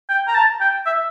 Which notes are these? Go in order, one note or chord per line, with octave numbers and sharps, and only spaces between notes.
G5
A#5
A5
G5
E5